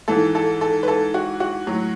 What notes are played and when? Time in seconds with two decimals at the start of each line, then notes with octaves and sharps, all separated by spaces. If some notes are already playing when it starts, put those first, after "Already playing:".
0.08 G#2 E3 A4
0.35 A4
0.61 A4
0.83 B4
0.88 A4
1.14 F#4
1.40 F#4
1.67 A2 F#3